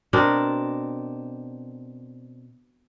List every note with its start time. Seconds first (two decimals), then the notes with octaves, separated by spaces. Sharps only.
0.13 B2 C4 D4 A#4